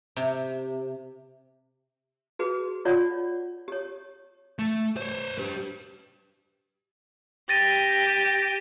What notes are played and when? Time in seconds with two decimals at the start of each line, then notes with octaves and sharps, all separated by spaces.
0.16 C3
2.39 F#4 G#4 B4
2.85 F4 C#5 D5 F#5
3.68 G4 C#5
4.59 A3
4.97 C5 C#5
5.38 G4 B4
7.49 G4 A6 A#6 D#7